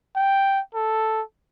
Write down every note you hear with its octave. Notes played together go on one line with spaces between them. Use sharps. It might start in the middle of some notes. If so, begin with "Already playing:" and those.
G5
A4